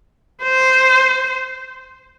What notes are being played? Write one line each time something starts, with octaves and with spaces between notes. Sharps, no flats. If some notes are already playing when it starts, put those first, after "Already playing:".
C5